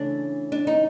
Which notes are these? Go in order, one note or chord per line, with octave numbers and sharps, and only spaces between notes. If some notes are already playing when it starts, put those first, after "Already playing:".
Already playing: C#3 E3 A3 D4
D4
D#4